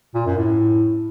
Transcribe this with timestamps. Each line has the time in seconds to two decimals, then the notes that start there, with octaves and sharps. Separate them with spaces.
0.14 A#2
0.26 F#2
0.37 A2